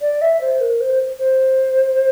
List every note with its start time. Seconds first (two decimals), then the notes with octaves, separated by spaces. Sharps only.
0.01 D5
0.22 E5
0.41 C5
0.60 A#4
0.81 C5
1.19 C5